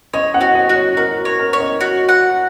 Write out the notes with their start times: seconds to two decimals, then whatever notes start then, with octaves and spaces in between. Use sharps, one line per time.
0.13 C#5 D#5
0.34 F#5
0.41 F#4
0.55 D#5
0.69 F#4
0.76 C#5
0.97 F#4 A#4
1.25 C#5
1.39 A#4
1.53 C#5
1.60 D#5
1.81 F#4
2.09 F#5